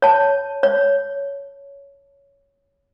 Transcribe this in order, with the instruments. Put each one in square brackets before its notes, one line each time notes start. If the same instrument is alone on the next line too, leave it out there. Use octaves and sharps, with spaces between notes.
[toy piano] C#5 A5
C#5